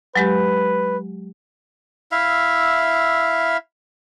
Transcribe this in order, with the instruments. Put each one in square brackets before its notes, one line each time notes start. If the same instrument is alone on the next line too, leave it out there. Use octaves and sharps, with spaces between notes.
[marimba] F#3 G#3 G4 [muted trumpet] B4
[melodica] E4 E5 F5